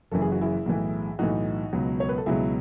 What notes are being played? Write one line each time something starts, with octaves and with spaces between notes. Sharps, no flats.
F#1 F#2 E3 A4
G#4
F#4
E4 G#4
B1 A2 E3
B1 A2 E3 D#4 F#4
C#2 B2 F#3
C#5
B4
A4
C#2 B2 F#3 E4 G#4